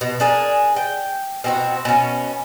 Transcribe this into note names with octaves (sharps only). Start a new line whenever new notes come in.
B2
D4 G#4 A#4
G5
B2 C4 F#4
B2 C#4